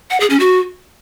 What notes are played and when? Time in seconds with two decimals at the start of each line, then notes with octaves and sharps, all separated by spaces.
0.11 F#5
0.20 G#4
0.30 C#4
0.40 F#4